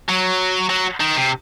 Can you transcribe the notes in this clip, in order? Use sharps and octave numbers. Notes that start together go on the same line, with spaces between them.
F#3
F#3
D#3
C3